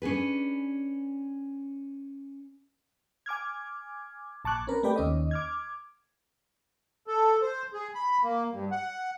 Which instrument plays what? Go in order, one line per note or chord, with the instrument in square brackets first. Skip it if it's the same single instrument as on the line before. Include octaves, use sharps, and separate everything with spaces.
[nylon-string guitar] C#4 D4 G#4 B4
[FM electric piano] G#5 D6 F6 G#6
A#1 A5 C#6 D6 F#6 G#6
C4 C#4 A#4 B4
A3 G4 B4 D5 G5
D#2 C#4 D#5
D6 F6 G#6
[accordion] A4
C5
G#4
B5
A#3
G2
F#5